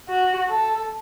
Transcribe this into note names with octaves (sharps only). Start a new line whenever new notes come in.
F#4
A4